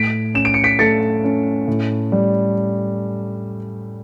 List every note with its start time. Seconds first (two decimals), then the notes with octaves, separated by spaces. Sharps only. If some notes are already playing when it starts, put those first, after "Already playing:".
Already playing: A2 B6 D7
0.34 C#4 E7
0.45 D7
0.54 C#7
0.64 B6 D7
0.79 A3 A6 C#7
1.24 C#4
1.68 A2
2.12 G3